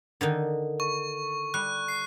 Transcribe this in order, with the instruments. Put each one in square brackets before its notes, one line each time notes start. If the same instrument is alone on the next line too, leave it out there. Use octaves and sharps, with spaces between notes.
[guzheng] D3 D#3 D#4
[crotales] C#6
[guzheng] G3 [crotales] F#6
[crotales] C7